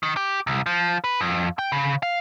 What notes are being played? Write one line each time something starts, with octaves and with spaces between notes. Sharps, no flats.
D#3
G4
C2
F3
B4
F2
G5
C#3
F5